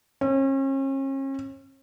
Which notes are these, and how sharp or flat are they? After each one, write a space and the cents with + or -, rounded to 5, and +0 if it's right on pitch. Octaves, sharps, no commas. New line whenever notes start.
C#4 -40